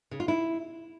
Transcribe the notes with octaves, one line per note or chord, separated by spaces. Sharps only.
C#3
F4
E4